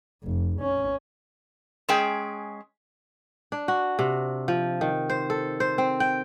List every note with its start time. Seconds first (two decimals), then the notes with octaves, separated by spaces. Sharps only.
0.24 F1
0.61 C#4
1.89 G#3 C#4 G#4 G5
3.52 D4
3.68 F#4
3.99 C3
4.48 F3
4.81 D#3
5.10 C5
5.30 A4
5.60 C5
5.78 C4
6.00 G5